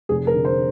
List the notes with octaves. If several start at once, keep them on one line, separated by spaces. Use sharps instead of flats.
F1 G#4
A#4
D3
C5